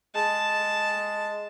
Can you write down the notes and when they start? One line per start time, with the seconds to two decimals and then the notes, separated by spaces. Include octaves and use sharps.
0.15 G#3 A5